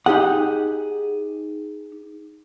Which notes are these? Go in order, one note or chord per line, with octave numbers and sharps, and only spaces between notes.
D#4 G4 G#4 F#5